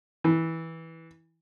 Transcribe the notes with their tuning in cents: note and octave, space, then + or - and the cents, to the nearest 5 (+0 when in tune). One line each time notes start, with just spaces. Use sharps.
E3 -15